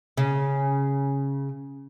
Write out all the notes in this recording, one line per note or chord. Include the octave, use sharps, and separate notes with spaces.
C#3